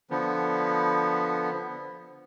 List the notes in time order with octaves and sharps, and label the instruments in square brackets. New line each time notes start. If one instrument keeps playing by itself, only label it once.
[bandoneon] D3 F3 B3